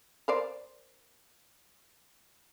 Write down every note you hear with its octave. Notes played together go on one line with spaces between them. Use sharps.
A#4 C5 D5